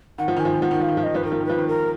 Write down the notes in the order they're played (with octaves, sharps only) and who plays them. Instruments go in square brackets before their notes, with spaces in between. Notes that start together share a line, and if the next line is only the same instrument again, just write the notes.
[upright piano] D#3 [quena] F#5
[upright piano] F3
[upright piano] D#3 [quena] G#5
[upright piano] F3
D#3
[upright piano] F3 [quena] F#5
[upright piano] D#3
[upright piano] F3 [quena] F5
[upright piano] D#3
F3
[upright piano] D#3 [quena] D#5
[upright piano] F3 [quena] B4
[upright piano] D#3 [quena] A#4
[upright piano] F3
D#3
[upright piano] F3 [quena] B4
[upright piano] D#3
[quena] A#4